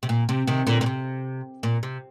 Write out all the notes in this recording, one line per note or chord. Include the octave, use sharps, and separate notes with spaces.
C3
A#2
C3
C3 D#3
A#2 D3
A#2
C3
A#2
C3